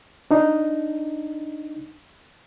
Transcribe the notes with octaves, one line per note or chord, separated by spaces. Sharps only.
D4 D#4